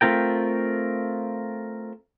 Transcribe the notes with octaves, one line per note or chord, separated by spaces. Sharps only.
A3 C4 F4 A#4 G5